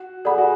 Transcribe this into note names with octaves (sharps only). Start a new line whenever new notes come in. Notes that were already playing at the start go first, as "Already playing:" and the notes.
Already playing: F#4
G#4 A4 D5 F#5 B5
F#4